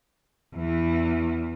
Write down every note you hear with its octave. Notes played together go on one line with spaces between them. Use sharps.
E2 E3